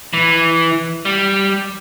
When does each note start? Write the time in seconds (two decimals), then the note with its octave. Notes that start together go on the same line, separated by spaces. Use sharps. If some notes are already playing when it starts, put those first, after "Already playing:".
0.13 E3
1.05 G3